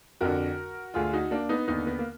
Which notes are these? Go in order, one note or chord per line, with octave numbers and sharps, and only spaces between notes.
F2 D3 F#4 A#4
D2 D3 F4 G#4
D#4 F#4
A#3 D4
B3 D#4
D#2 D3 B3 D#4
B3
A#3